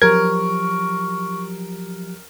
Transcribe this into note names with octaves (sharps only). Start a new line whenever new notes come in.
F3 F#3 G4 A#4 C#6 G#6